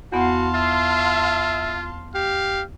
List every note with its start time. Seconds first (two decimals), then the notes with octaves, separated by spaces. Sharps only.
0.12 E2 B3 F#4 F5 F#5 A5 C6
0.55 F4 E5
2.15 G4 F5